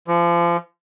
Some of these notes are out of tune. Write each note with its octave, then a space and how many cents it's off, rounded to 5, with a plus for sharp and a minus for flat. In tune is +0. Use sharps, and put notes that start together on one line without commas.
F3 -30